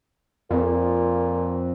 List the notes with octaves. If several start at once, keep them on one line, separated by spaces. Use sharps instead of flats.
F2 A#2